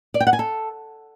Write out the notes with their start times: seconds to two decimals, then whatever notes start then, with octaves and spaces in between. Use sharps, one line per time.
0.14 D5
0.20 G5
0.27 F#5
0.33 G#5
0.39 A4